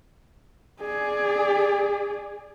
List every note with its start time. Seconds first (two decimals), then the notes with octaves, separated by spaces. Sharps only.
0.81 G#4 D5